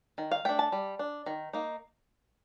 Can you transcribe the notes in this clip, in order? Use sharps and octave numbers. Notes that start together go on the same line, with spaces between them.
D#3
F5
A3 D4 G5
A5
G3
D4
D#3
A#3 D#4